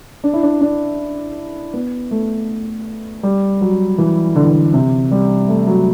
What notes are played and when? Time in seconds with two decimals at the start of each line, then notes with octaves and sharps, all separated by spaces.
0.24 D4
0.33 E4
0.43 D4
0.61 D4
1.74 B3
2.11 A3
3.23 G3
3.61 F#3
3.98 E3
4.36 D3
4.44 E3
4.52 D3
4.74 C3
5.11 G3
5.49 A3
5.67 F#3